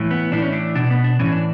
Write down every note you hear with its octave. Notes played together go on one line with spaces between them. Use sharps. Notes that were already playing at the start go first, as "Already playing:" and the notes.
Already playing: A2 E3
B3
A2 E3 D4
C#4
D4
B2 D4
B3
D4
A2 E3 C#4
D4